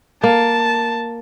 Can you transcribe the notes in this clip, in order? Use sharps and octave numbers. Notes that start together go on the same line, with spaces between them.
A#3 A5